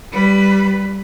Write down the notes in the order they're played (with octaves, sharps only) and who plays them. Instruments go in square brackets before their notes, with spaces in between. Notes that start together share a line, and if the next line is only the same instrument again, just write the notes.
[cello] G3 B4